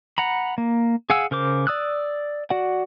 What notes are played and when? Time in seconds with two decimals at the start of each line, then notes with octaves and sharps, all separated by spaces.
0.18 F#5 A#5 B5
0.58 A#3
1.10 G#4 F5 F#5 G#5 E6
1.31 C#3 A#4 C5 D6
1.67 D5 D#6 E6 F#6
2.50 F#4 D5 F#5